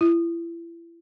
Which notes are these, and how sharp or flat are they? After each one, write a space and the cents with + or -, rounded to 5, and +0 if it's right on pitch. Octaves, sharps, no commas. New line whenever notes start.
E4 +35